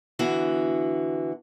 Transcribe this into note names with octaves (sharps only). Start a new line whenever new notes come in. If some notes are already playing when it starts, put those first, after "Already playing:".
D3 E3 B3 F#4